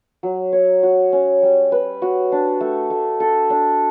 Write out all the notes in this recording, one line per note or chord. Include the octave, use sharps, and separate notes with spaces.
F#3
C#5
F#4
C#4
G3
B4
F#4
D4
A3
A3
A4
D4